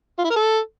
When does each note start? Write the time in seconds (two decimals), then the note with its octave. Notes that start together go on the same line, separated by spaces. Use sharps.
0.18 F4
0.24 E4
0.30 A#4
0.36 A4